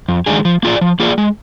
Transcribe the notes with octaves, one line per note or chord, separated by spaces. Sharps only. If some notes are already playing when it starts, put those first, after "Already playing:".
F2
D#3 G#3 D4 G#4
F3
A#3 F4 G#4 D5
F3
A#3 F4 G#4 D5
G#3